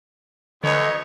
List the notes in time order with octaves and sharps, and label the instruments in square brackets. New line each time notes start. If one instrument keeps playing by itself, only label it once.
[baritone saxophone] D2 [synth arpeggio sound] D3 B4 [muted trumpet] C#5 [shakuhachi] D#5